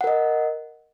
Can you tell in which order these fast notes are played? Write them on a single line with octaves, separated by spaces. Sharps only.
F#5 A#4 D#5